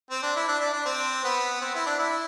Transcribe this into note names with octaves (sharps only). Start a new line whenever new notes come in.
C4
D4
E4
D4
D4
D4
C4
B3
C4
E4
D4
E4